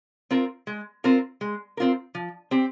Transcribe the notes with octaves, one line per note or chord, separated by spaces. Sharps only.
C4 F4 A#4
G#3
C4 F4 A#4
G#3
C4 F4 A#4
F3
C4 G4